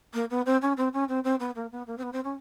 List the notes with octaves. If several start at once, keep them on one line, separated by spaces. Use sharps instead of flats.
A#3
B3
C4
C#4
C4
C#4
C4
C4
B3
A#3
B3
A#3
C4
B3
C4
C#4